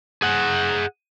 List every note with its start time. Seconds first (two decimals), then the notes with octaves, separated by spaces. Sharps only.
0.22 G#4 F#5